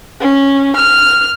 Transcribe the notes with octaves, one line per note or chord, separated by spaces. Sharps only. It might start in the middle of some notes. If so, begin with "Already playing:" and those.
C#4
F6